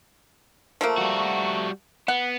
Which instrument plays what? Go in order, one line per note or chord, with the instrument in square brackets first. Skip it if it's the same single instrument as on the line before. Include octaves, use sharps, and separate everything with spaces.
[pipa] F3 A3 A#3
[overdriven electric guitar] G3 F#4
[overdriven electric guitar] B3 [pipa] F#5